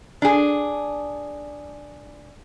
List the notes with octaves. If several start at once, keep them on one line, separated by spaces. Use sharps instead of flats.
D4 G#4